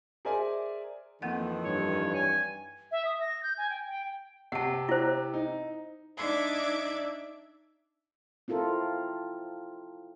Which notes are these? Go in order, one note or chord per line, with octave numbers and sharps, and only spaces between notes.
G#4 A#4 C5 D5 E5 G#5
F2 D#3 E3 A#3 C4 F#5
G2 C#5
G#5
E5
D#6
A#6
G6
G#5
G5
G5
C3 F#5 A5
E4 C5
D#4
D4 D#4 D5 E5 D6 G#6
C4 E4 F4 A4 A#4